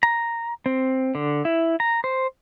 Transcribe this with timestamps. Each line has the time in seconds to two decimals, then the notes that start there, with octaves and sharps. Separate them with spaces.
0.03 A#5
0.66 C4
1.15 D3
1.45 E4
1.80 A#5
2.04 C5